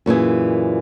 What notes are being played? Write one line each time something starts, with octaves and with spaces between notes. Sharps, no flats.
F#2 A#2 E3 G#4